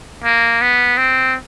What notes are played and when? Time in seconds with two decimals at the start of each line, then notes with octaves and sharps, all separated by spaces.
0.24 A#3
0.61 B3
0.98 C4